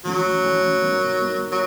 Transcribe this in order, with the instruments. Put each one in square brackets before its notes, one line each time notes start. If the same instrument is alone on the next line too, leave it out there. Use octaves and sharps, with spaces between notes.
[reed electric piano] E3 A3 C#4 [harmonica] F#3
[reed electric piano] E3 A3 C#4
G3 B3 D#4 F#4 A#4
G3 B3 D#4 F#4 A#4
[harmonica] F#3